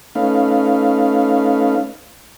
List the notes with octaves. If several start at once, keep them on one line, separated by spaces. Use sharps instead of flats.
A3 C#4 D#4 B4 F5